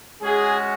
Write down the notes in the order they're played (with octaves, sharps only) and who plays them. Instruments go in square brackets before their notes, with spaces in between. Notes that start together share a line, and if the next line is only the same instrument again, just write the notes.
[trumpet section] G#3 C#4 F#4 G#4